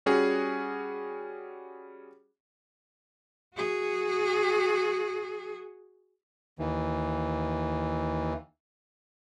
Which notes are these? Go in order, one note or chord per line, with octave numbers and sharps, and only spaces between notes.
G3 C#4 F#4 G#4
F#4 G#4
D#2 E3